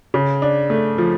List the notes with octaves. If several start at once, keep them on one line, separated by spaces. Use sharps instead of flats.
C#3
D4
A3
F3